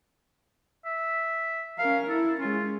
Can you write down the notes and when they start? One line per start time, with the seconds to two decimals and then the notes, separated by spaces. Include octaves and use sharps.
0.85 E5
1.79 C#4 A#4 F5
2.09 E4 A4
2.40 G#3 C#4 F4